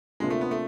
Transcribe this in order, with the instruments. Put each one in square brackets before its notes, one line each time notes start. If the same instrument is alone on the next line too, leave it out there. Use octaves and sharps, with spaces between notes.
[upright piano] C3 F3 A#3 D4 F4 [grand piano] G#3
[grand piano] A3
B3
A3